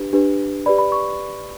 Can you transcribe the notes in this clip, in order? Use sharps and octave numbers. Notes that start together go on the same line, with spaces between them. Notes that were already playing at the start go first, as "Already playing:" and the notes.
Already playing: D4 G4 B4
D4 G4 B4
G4 B4 D5 B5
B5
C#6